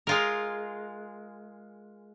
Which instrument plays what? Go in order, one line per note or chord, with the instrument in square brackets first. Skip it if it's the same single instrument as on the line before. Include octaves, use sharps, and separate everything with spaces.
[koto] G#3 F4 A#4